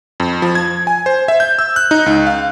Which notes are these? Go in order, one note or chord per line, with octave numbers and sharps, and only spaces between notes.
F2
F3
G#6
G#5
C5
E5
G6
E6
F#6
D#4
C#2
F5